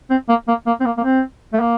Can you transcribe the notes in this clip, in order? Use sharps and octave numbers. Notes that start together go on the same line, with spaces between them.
C4
A#3
A#3
A#3
C4
A#3
A#3
C4
A3
A#3